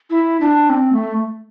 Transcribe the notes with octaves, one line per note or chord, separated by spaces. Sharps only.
E4
D4
C4
A3